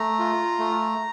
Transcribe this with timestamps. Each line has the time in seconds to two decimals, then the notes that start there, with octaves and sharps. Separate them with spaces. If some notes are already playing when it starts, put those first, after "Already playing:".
Already playing: A3 A#5
0.19 F4
0.59 A3